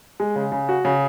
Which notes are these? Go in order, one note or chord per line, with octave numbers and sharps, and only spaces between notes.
G#3
C#3
C#3
F#4
C#3